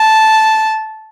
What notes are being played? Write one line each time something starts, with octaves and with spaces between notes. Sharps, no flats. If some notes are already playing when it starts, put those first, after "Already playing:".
Already playing: A5